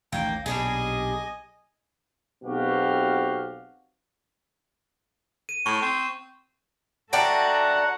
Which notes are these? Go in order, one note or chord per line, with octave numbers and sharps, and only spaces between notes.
A1 D#2 A#3 G5
B1 A#2 G3 D4 G#4 D#5 G#5
B1 B2 C4 F#4 G4 F5
D#7
A2 C#6
C4
D4 F#4 A4 E5 F#5 G5 A5 A#5